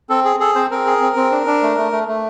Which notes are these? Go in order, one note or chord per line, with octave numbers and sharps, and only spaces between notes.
C4 A4
G#4
G#4 A4
C4 C5
C4 A#4
G#4
C4
C4
D4
D4
A3
A3
A3
A3